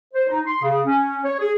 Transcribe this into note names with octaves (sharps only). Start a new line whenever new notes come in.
C5
D#4
C6
C#3
C#4
C#5
G#4